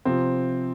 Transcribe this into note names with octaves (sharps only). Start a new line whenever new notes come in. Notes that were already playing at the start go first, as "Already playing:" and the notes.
C3 F3 C4